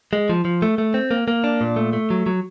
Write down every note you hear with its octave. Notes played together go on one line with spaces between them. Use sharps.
G#3
F3
F3
A3
A3
C4
A#3
A#3
D4
A#2
A3
A3
F#3
F#3